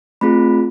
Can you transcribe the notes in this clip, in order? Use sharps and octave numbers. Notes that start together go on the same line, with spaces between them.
A3 C4 F4 G#4 B5